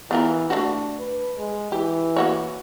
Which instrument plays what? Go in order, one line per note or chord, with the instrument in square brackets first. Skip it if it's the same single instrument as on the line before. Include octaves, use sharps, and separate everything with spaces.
[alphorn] E3 [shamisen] B3 F4 A#4
[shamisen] A3 F4 F#4 [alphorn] D4
[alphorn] B4
G#3
[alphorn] E3 [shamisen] G4
[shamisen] A#3 F#4 C#5